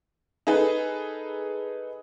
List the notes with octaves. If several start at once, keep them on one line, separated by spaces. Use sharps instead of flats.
D#4 G#4 A4 B4